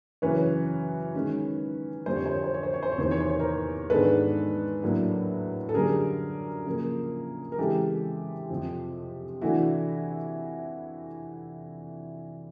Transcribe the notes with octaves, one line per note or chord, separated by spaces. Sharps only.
F#2 C#3 E3 B4 C#5
D#3 G#3 C#4
F2 D3 G3 C5
C#5
C5
C#5
C5
C#5
C5
C#5
C5
C#5
E2 C3 D#3 C5
C#5
C5
C#5
A#4 C5
G#2 D#3 G#3 B3 D4 A4 B4
A2 F#3 A#3 D4
A4
F#2 D3 G3 G#4 A#4
C#3 F3 A#3
A#4
C#3 E3 G#3 C4 G4 A4
F2 C3 F3
C3 E3 A3 D4 E4 F#4